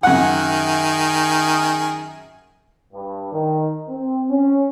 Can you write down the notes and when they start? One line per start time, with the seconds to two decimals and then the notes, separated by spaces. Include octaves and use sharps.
0.03 F#2 D#3 G#4 F#5
2.93 G2
3.32 D#3
3.89 C4
4.30 C#4